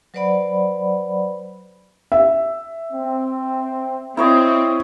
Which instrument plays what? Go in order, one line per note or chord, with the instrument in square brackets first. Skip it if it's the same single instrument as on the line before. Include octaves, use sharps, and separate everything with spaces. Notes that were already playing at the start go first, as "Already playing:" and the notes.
[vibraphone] F#3 B4 C5 D5 F#5 B5
[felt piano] E5
[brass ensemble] C4
[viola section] C4 [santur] E4 C#5 D#5